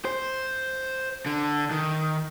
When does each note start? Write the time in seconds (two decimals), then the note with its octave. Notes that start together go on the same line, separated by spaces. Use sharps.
0.05 C5
1.26 D3
1.71 D#3